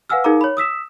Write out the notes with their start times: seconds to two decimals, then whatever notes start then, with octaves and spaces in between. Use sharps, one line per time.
0.10 B4 F5 F#5 G#5 E6 F6
0.24 D#4 G#4 A#4 F5 A#5 D6
0.41 C#5 B5
0.57 D#6 E6 B6 E7